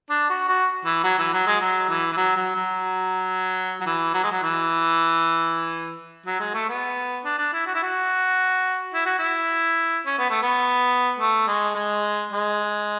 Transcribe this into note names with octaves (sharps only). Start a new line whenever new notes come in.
D4
F#4
F#4
E3
F#3
E3
F#3
G#3
F#3
E3
E3
F#3
F#3
F#3
F#3
E3
F#3
G#3
F#3
E3
F#3
G#3
A3
B3
D4
D4
E4
F#4
E4
F#4
E4
F#4
E4
C#4
B3
A3
B3
A3
G#3
G#3
G#3